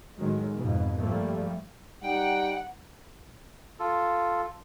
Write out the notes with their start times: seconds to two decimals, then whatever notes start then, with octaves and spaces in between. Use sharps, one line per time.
0.18 A2 D#3 F#3 G#3
0.55 F2 G#2 B2
0.99 G2 A#2 F3 G3 A3 A#3
2.03 G3 D#4 F#5 G5
3.79 F4 A4